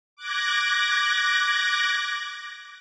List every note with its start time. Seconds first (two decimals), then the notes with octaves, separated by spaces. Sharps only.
0.16 D6 F#6 G#6 A#6